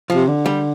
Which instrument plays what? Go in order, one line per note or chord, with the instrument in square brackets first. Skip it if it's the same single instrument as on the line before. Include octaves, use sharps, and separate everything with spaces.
[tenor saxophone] C3 [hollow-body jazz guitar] F3
[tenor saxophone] D3
[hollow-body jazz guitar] G3